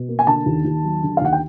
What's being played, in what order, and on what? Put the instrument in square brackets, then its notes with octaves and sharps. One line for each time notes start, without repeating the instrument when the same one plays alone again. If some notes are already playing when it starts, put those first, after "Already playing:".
Already playing: [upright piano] B2
A#3
G#5
D3 A5
D#2
D#2
F#3
D3
F5
D#2 F#5
G5